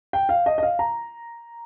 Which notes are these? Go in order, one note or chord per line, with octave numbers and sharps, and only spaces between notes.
G5
F5
D#5
D#5
F5
A#5